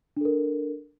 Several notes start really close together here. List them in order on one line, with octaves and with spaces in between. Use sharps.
D4 A4 A#4